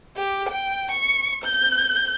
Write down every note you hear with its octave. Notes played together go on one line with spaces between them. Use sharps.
G4
G5
C#6
G6